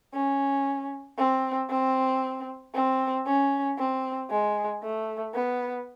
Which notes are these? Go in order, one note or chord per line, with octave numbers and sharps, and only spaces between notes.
C#4
C4
C4
C4
C#4
C4
G#3
A3
B3